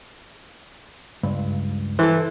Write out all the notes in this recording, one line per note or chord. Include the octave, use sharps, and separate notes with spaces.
C#2 G2
E3 A4 C5